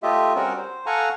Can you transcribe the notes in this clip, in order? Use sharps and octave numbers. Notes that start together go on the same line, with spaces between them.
A3 F4 G4 D#5 E5
G3 C4 C#4 F#4 A#4
C5
A4 F5 F#5 G#5 A#5 C#6